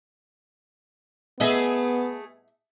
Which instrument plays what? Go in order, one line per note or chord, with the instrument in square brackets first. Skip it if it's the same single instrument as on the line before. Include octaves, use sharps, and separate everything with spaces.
[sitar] A3 G#4 [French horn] B3 [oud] D#5 E5